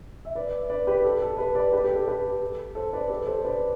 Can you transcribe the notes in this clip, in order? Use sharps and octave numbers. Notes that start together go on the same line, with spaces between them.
E5
B4 D5
B4 D5
G4 B4
A4
A4
G4 B4
B4 D5
G4 B4
G4
A4
G4 B4
A4 C5
B4 D5
G4 B4
A4 C5
B4 D5